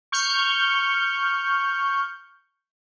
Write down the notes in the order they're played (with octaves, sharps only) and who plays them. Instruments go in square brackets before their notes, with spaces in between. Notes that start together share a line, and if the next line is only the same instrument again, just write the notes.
[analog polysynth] C#6 F6 G6